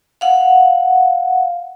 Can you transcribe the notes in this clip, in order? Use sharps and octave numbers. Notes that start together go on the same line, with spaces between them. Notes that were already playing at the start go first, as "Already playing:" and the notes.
F5 F#5